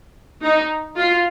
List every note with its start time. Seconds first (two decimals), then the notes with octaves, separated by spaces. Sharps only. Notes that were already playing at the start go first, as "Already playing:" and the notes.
0.42 D#4
0.97 F4